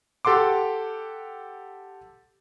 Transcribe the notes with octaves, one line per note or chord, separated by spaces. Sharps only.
G4 A4 F#5 C6 D6